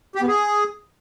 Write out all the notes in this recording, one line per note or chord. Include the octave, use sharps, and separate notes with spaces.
G4
B3
G#4